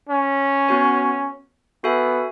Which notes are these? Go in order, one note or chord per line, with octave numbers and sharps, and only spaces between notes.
C#4
B3 F#4 C#5 G#5
B3 F#4 A4 E5 G#5